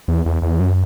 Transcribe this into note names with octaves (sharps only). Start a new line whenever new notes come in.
E2
E2
E2
F#2